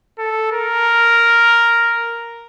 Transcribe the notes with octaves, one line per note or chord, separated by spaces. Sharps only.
A4
A#4